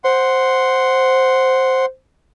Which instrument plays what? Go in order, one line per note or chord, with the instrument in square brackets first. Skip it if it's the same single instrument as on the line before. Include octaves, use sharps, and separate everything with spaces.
[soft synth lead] C5 [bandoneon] F#5 C6